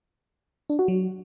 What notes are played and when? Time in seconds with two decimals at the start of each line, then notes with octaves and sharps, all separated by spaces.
0.70 D4
0.79 F#4
0.88 F#3